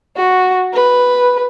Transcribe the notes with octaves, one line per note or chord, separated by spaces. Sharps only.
F#4
B4